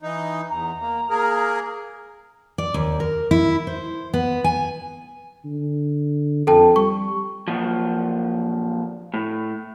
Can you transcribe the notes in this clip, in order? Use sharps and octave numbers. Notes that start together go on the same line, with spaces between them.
E3 D#4
E2 A#5
A#3
A#3 G#4 A#4
D5
D#2
A#4
E4
C5
B3
G#5
D3
F2 A4 G5 A5
G3 C#6
F#2 A#2 F3
A2